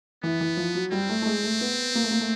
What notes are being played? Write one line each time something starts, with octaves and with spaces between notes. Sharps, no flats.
E3 B3
E3
F3
F#3
G3 C4
A3
A3
G#3
A3
B3
A#3
A3
A#3
A3